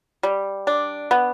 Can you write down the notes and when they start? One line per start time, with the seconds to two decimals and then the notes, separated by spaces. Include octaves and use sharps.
0.23 G3
0.67 D4
1.11 B3